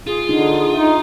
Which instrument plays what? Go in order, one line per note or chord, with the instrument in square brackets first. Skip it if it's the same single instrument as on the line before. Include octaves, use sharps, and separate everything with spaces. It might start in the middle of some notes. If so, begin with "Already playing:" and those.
[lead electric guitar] F4 [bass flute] G#4
[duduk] D3 [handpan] D4 D#4
[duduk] D#4 [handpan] E5